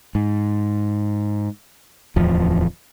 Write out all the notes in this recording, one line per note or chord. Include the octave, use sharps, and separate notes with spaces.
G#2
D1 E2 F3